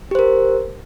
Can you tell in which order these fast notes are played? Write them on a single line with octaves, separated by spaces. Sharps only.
G4 C5 A#4